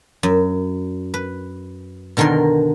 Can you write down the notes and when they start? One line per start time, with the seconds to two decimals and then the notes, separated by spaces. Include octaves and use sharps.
0.23 F#2
1.14 B4
2.17 B2 D3 D#3 A#4 C6